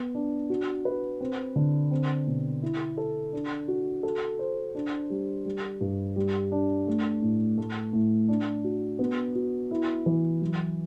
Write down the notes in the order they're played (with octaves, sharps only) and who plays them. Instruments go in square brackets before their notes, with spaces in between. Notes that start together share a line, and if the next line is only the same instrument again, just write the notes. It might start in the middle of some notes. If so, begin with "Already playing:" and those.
Already playing: [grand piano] B3
D4
F#4
B4
C4
D3
C4
B2
E4
A4
D4
F#4
A4
C5
D4
G3
G3
G2
G3
D4
A3
A2
A3
A2
D4
F#4
B3
F#4
E4
E3
F#3